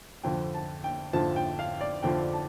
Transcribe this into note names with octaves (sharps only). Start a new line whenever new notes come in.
F2 D3 F3 G5
A5
G5
F2 D3 F3 A5
G5
F5
D5
F2 D3 F3 G5
A5